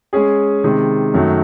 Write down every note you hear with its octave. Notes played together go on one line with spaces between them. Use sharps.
G#3 C#4 G#4
C3 D#3 G#3
F#2 D#3 F#3 A3